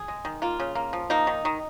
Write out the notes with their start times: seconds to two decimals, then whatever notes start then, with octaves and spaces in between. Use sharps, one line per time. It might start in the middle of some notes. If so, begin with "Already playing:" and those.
Already playing: G#4
0.08 G#3
0.25 D#3
0.42 A#3 F4
0.60 C#3
0.75 A#3
0.93 F3
1.10 A#3 D#4
1.27 D#3
1.45 D#3